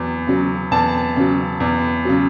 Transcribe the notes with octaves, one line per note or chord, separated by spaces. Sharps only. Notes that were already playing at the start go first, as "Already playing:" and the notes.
Already playing: E2 F#3
C#3 F#3
E2 A5
C#3 F#3
E2
C#3 F#3